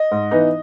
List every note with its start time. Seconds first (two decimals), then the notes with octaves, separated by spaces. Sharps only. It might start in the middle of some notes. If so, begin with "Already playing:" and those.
Already playing: D#5
0.11 G#2
0.31 E3 B3 D#4